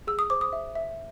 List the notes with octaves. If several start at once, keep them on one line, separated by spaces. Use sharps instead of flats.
G#4 E6
D#6
C5 D6
D#6
E5
E5